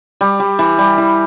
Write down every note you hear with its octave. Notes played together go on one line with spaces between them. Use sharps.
G3
G3
E3
G3
E3